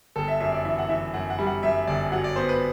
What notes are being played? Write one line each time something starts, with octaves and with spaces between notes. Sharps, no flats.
G1 A4
E5
F#2 E5
D5
E3 E5
F#5
E3 E5
F#2 F#5
F#5
G3
F#5
F#2 E5
G1 D5
F#3 F#5
D5
B3 C5
B4